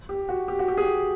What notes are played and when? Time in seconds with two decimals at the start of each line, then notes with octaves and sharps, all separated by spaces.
0.09 G4
0.29 F#4
0.48 G4
0.59 F#4
0.68 G4
0.77 G#4